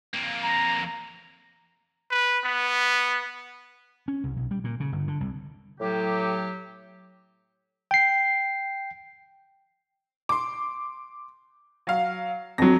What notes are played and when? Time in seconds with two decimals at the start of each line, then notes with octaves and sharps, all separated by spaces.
0.14 F2 A#3
0.43 A#5
2.11 B4
2.44 B3
4.08 C#4
4.24 C2
4.37 B1
4.51 G3
4.64 A#2
4.80 C#3
4.92 G1
5.08 D3
5.20 C2
5.80 A2 F#3 G4
7.91 G5 C7
10.29 C6 D6
11.87 F#3 F5
12.58 F2 F#3 A#6